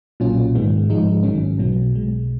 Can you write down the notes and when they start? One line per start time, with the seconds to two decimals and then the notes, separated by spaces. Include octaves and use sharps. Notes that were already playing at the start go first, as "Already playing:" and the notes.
0.20 B1 A#2 F#3 C#4 F4
0.55 G#2 D#3 G#3 B3
0.89 G#2 F3 G#3 D#4
1.23 G#1 G#2 D#3 F#3 C#4
1.57 B1 B2 F#3 B3
1.93 B1 B2 G#3